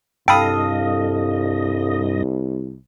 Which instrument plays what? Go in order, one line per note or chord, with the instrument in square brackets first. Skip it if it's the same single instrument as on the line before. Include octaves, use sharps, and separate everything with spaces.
[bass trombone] C2 [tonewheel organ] G2 D#5 [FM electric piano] A4 F5 D#6 [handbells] G5 B5